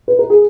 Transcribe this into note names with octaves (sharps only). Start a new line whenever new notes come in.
B4
A#4
G#4